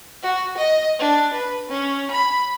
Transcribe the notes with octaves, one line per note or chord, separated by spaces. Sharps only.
F#4
D#5
D4
B4
C#4
B5